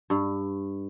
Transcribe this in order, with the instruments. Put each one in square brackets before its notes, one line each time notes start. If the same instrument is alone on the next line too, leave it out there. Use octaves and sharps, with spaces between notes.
[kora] G2